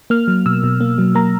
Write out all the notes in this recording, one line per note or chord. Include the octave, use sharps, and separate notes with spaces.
A#3 F6
F#3
B2 E6
B2
A#3
F#3
A#3 A#5